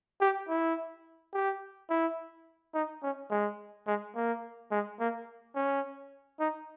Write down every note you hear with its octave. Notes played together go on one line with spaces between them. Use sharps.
G4
E4
G4
E4
D#4
C#4
G#3
G#3
A#3
G#3
A#3
C#4
D#4